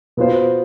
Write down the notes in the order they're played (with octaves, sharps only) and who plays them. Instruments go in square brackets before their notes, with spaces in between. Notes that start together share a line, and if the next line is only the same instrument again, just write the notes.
[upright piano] B2 B3 F4 C5